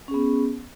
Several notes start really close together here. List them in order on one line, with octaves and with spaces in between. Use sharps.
C#4 G#4 B3